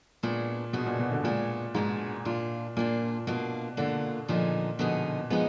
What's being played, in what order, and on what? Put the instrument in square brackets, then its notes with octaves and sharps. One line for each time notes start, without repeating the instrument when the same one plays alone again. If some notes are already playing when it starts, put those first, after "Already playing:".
[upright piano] A#2 [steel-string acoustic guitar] G#3 B3 D4 F#4
[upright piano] B2 [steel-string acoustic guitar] G#3 B3 D4 F#4
[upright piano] A#2
B2
D3
[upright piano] A#2 [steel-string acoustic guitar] G#3 B3 D4 F#4
[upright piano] G#2 [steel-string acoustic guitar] G#3 B3 D4 F#4
[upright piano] A#2 [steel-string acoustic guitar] A#3 D4 F4
[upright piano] A#2 [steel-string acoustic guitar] A#3 D4 F4
[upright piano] B2 [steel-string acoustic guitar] A#3 D4 F4
[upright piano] D3 [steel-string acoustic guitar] A#3 D4 F4
[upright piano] A#2 [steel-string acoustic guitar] D3 F3 B3 D#4 G#4
[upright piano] B2 [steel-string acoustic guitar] D3 F3 B3 D#4 G#4
[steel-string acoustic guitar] D3 F3 B3 D#4 G#4 [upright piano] G#3